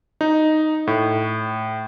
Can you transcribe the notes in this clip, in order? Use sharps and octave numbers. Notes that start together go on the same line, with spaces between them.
D#4
A2